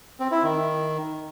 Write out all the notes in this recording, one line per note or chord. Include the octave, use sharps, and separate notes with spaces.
C4
E4
D#3